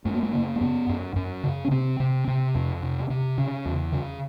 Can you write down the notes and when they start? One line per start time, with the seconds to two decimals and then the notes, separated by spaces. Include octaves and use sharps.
0.05 F#2 A3
0.14 A#3
0.23 A3
0.33 C#3 A#3
0.56 A#3
0.61 F#2 B3
0.89 F#2
1.16 F#2
1.43 C#3
1.65 C#4
1.71 C3 C4
2.00 C3
2.27 C3
2.55 F2
2.82 C3
3.10 C3
3.38 C#3
3.65 E2
3.92 C#3